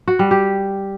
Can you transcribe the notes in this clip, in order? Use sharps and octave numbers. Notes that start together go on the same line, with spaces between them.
F#4
G3
G4